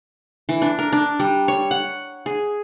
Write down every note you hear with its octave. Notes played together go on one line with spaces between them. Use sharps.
E3
D4
A#4
D4
G3
C#5
F#5
G#4